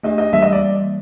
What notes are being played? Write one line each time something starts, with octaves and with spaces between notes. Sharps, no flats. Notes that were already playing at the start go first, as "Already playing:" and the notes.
A3 D4 G4 D#5
D#5
E3 G3 A#3 E5
D#5
D5